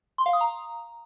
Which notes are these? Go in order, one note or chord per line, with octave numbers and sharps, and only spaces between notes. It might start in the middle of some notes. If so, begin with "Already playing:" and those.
C6
F5
D#6
A#5